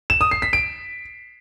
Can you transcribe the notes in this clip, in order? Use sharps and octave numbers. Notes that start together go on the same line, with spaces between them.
E7
D#6
C7
B6
D7